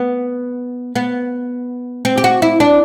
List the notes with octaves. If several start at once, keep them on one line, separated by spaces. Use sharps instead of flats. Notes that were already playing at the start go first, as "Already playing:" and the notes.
Already playing: B3
B3
C4
G4
F#4
E4
D4